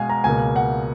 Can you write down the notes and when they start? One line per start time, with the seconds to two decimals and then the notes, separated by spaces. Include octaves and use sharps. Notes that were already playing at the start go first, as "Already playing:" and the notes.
Already playing: B2 G#3 F5 G#5
0.09 A#5
0.24 C#2 B2 A#3 G#5
0.56 F#5